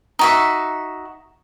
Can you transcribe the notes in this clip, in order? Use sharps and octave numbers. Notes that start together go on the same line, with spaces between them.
D#4 F#4 E5